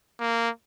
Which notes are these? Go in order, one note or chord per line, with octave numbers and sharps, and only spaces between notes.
A#3